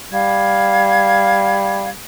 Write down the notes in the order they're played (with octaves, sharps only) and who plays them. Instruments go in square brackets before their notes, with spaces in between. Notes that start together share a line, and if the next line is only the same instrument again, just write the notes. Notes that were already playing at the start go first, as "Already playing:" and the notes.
[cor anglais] G3 [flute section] F5 G#6